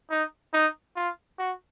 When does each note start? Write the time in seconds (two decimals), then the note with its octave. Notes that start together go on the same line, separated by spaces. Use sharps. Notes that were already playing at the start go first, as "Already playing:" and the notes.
0.11 D#4
0.54 D#4
0.96 F4
1.39 F#4